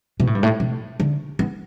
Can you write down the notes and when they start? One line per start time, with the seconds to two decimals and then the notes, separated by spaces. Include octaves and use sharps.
0.20 B2
0.27 A2
0.35 G2
0.43 A2
0.60 B2
1.00 D3
1.39 B3